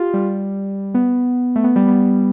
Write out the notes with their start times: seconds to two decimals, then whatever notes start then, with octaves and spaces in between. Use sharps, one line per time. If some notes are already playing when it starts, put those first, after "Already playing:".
Already playing: F4 G4
0.14 G3
0.95 B3
1.56 A3
1.64 B3
1.76 G3
1.88 B3